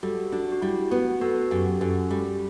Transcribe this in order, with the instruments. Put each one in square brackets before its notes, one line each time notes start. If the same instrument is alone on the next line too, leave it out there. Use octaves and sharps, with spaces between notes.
[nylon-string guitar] G3 [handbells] F#4 A4
[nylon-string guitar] D4 [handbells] F#4
[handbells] F#4
[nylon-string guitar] G3 [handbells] E4
[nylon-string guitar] B3 [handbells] F#4
[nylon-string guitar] B3 [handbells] F#4 A4
[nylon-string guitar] F#2 [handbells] G4
[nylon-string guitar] F#2 [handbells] F#4 A4
[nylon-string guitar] G3